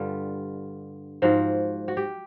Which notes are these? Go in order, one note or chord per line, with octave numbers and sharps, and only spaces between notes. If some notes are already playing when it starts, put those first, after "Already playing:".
Already playing: G2 D3 G3 F4
G#2 F3 F#4
F#4
G4